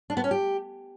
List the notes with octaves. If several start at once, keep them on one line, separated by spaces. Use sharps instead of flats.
D4
B3
C#4
G4